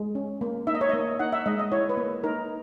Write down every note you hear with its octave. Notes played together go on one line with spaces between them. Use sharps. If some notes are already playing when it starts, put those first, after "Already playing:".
Already playing: G#3
C#4
A#3
D#4 E5
D#5
C#5
A#3 D#5
D#4 F#5
E5
G#3 D#5
D#5
E4 C#5
B4
A#3
D#4 A#4